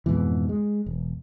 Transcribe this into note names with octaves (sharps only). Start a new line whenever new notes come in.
F2 G#2 B2 E3
G#3
E1